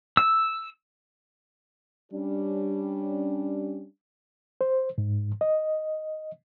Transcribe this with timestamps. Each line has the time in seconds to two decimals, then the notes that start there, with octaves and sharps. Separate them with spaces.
0.17 E6
2.12 G3 C#4 D4
4.61 C5
4.98 G#2
5.41 D#5